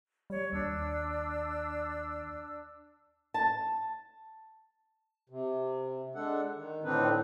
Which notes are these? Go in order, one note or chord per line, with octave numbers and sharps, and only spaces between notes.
G3 C#5
D#2 D4 E6
A5
C3
G#3 D4 A4 F#5
D#3
A2 D3 C4 D4 D#4 B4